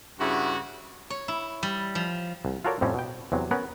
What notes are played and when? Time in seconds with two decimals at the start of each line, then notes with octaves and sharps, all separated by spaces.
0.19 G2 C#3 E4 F#4
1.10 C#5
1.28 E4
1.63 G3
1.95 F3
2.45 C2
2.65 F4 F#4 A4 A#4 C#5 D5
2.81 F2 A2 G3 C4 C#4
2.94 B2 G5
3.32 E2 C3 F#3
3.51 B3 C#4 A#4 B4